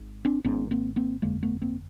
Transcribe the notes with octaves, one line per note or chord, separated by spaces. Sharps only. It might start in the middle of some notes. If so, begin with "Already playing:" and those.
Already playing: G#1 G#2
C4 D4
G#1 G#2 B3 C#4
A#3 C4
A#3 C4
G1 F2 D3 G#3 A#3
A3 B3
A#3 C4